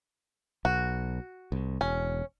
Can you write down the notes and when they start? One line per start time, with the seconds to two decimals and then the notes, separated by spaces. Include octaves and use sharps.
0.65 B1 F#4
1.52 C2
1.81 E1 C#4